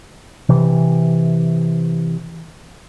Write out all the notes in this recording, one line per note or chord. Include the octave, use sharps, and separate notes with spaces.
C3 E3